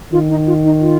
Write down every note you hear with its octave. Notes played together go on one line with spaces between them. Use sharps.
D#3 F4
D#4
F4
D#4
F4